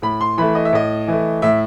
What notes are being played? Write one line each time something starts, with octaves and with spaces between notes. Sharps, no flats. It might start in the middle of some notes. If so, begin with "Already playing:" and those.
A2 B5
C6
E3 A3 B5
D#5
E5
A2 D#5
E3 A3
A2 E5